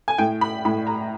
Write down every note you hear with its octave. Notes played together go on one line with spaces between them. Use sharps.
G#5
A2 G5
B5
A2 B5
A#5